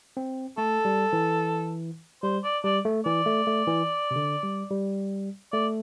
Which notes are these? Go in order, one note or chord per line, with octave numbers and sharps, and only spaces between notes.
C4
A3 A4
G3
E3
G3 C5
D5
G3 D5
A3
E3 D5
A3
A3
E3
C3
D3
G3
G3
A3 D5